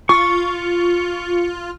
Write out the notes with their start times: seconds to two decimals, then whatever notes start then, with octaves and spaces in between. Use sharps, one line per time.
0.09 F4 C#6